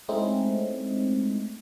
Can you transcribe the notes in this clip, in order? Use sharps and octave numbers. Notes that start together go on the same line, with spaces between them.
G#3 A3 C4 C#4 D#4 E4